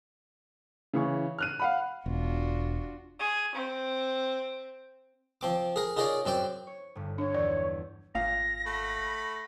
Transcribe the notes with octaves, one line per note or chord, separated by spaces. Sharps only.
C#3 E3 C#6
F6 F#6 D#7
F5 F#5 B5
E1 D4 F4 F#4
G#4
C4
F3 C4 D6
G#4 A#4
D#4 F4 G#4 A#4 C#5 D5
F#2 C4 D5 G5
C#5
G1 G2
D4 C#5
E2 D5
G#1 A#2 F5 A#6
A3 F#5 B5